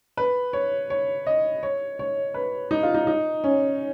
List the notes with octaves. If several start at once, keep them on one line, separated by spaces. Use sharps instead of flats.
B4
C#5
C#5
D#5
C#5
C#5
B4
D#4
F4
D#4
D#4
C#4